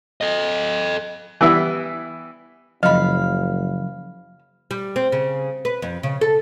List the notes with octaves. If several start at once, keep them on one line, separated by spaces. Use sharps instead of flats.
A4 D#5
E3 G3 B3 E4
F#1 C#3 F3 F#3 D#5 F5 B5
G3
C4
C#3
B4
F2
C#3
A4